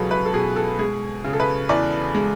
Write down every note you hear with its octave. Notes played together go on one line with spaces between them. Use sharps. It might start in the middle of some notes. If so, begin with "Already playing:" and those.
Already playing: C#2 B2 F#3 G#4 A4 B4
B4
A4
B2 G#4
A4
G#3 G#4
C#3
A4
B4
E2 D5
G#3